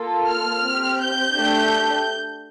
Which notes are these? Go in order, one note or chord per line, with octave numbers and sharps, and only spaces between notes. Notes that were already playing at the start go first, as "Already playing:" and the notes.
Already playing: A#3 F4 A4
F6
C4
G4
G6
A3 D4 G4